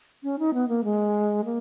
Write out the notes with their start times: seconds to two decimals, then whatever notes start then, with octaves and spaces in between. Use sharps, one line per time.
0.23 C#4
0.39 D#4
0.54 B3
0.68 A#3
0.84 G#3
1.45 A#3